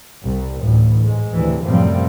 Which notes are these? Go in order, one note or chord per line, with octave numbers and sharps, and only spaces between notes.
C2
A1 D2 A2
G#2 G#3
D2 C3 E3
F#2 A2 C3 F3 G3 C4